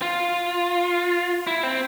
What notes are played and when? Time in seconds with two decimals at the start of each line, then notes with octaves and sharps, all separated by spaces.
0.02 F4
1.47 E4
1.63 C4